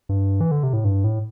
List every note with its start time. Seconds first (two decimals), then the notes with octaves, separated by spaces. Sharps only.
0.09 G2
0.41 E3
0.51 D3
0.63 C3
0.73 A2
0.85 G2
1.04 A2